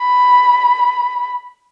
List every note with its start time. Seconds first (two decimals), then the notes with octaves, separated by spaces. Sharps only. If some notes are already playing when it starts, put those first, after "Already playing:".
Already playing: B5